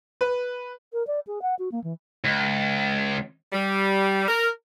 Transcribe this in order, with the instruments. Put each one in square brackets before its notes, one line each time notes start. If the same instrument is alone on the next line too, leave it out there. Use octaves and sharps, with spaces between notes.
[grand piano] B4
[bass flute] A#4
D5
G#4
F#5
F#4
A#3
E3
[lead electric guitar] C#2
[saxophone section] G3
A#4